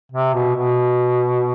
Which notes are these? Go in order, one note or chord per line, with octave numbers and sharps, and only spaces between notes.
C3
B2
B2